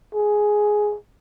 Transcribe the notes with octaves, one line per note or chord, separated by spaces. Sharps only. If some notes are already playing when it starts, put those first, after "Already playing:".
G#4